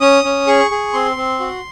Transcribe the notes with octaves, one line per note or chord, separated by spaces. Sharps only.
C#4 D#6
C#4
G#4 C#6
G#4
C4 C6
C4
F#4